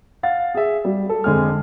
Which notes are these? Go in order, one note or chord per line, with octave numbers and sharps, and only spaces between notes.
F5 F#5 A6
G#4 E5
G3
A4
F2 D3 G#3 G#5 F6